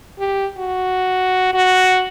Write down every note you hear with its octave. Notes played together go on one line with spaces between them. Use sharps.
G4
F#4
F#4